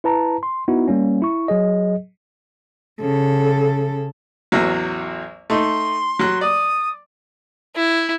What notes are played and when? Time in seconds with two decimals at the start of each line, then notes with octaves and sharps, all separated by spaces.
0.04 E4 B4 A5 A#5
0.43 C6
0.68 B3 D#4 E4 F#4
0.88 G3 A#3 C#4
1.22 E4 C#6
1.48 F#3 G#4 D#5
3.00 C#3 A4
4.52 A1 E2 F#3
5.50 A3 D#4 C6
6.19 F#3 F#6
6.41 D5 D#6
7.76 E4